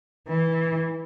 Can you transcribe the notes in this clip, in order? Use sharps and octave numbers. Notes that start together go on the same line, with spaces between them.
E3